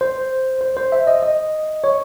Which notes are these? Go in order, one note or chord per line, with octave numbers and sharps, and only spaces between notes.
C5
C5
C5
E5
D#5
D#5
C#5